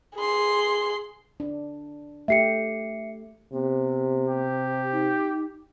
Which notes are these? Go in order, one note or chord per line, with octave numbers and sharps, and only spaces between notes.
G#4 C6
D4
A3 G4 E5 C7 C#7
C3 B3
G4
D#4